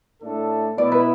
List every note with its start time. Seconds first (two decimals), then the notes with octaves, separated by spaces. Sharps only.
0.22 A2 A3 D4 A4
0.78 B2 B3 E4 D5
0.92 B4